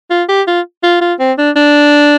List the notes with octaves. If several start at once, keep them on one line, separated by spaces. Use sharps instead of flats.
F4
G4
F4
F4
F4
C4
D4
D4